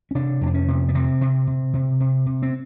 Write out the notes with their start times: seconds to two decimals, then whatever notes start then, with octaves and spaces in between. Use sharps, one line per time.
0.11 C#4
0.15 C3 D4
0.41 F2
0.46 D4
0.54 C#4
0.68 C3
0.89 B3
0.94 C3 C4
1.21 C3
1.47 C3
1.74 C3
2.00 C3
2.26 C3
2.42 C4